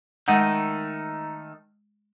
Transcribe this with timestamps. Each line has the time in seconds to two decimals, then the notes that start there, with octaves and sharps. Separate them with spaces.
0.28 D#3 G#3 A3 D#4 F#5